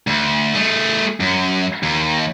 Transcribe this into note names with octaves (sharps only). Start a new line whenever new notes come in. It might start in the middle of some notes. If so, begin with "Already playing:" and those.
D2
A3 G#4
F#2
D#2